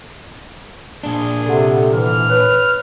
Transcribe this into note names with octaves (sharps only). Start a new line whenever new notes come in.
A#2 D4 G#4
C3 A4 F#5
E3 F6
B4 C#5